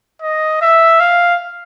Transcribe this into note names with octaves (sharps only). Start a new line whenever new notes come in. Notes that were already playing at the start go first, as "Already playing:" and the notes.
D#5
E5
F5